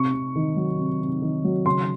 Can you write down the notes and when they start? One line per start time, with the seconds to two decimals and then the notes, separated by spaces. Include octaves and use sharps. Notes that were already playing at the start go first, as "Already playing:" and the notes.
Already playing: C3 C#6
0.14 C3
0.36 D#3
0.57 F#3
0.79 C3
1.01 C3
1.22 D#3
1.44 F#3
1.66 C#3 C6